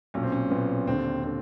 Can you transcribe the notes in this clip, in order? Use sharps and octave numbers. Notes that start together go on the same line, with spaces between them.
B1 A#2 C#4
C4
C#4
B1 A#2 B3
D#2 D3 C4
D3 C4